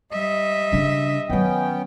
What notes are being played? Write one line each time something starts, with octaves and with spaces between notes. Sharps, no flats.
G3 D#5 E5
C#3 D4
D#3 F#3 B3 C#4 G5